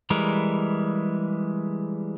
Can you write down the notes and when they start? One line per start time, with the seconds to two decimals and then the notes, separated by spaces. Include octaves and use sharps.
0.10 E3 G3 G#3 A#4